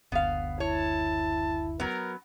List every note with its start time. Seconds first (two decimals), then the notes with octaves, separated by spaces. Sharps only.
0.12 F#1 D2 B3 F5
0.60 E4 C#5 A5
1.80 F#3 B3 A#4